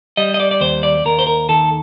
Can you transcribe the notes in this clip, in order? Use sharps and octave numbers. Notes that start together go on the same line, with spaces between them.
G3 D#5
D#5
D5
D5
D#2 C5
D5
D#2 A#4
C5
A#4
D#3 A4